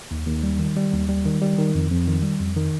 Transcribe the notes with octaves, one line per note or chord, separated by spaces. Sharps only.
D#2
D#2
G3
D#3
G3
D#2
G3
D#3
G3
D#3
F2
F2
D#3
G3
F2
D#3